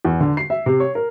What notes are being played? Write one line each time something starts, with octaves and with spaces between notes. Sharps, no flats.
E2
D3
C7
E5
C3
C#5
A#4